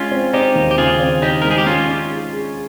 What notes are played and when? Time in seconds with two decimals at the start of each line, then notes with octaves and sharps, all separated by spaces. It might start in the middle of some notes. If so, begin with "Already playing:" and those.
Already playing: G#3 C#4 F4
0.11 C4
0.33 C4 D#4 G4
0.55 D#2
0.71 G4
0.78 C#3 F4 G#4
1.00 C4
1.22 C4 D#4 G4
1.42 G#3 A#4
1.51 G#4
1.58 G4
1.67 G#3 C#4 F4
1.88 D#4
2.11 G#4
2.33 G#4